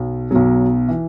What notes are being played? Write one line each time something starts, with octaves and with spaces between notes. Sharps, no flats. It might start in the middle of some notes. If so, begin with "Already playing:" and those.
Already playing: B1 B2
B1 B2 F#3
E3